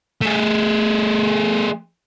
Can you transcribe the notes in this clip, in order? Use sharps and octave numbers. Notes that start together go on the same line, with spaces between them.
A3 G#4